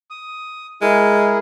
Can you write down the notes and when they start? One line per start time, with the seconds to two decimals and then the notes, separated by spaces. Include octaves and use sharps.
0.10 D#6
0.82 G#3 E4 G#4 A#4